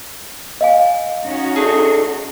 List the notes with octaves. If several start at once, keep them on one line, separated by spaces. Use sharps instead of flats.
D#5 F5 G#5
C#4 D#4 F#4
A3 D4 G#4